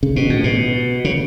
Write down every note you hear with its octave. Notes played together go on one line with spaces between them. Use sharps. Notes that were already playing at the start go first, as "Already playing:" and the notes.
C#3
B2
A2
B2
C#3